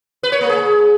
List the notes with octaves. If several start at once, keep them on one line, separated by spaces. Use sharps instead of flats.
B4
C#5
A#3
G#4